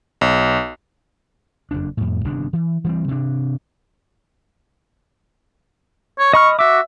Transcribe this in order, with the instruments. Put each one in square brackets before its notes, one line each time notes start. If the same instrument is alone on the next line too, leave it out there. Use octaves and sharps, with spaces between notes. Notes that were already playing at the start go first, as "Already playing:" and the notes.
[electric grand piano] B1
[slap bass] F#1 F2 D4
F2 A2
G1 C3 D#3 D4
E3
E3 G3 C4
C3 D4
[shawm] C#5
[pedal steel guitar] D#5 B5 F6 [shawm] C#6
[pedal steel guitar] F#4 D6 [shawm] E5